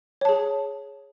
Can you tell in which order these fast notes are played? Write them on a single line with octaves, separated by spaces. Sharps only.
C#5 A5 G#4